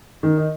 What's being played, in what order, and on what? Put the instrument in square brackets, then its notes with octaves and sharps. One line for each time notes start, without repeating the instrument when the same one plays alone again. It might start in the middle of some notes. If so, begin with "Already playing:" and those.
[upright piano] D#3
D#4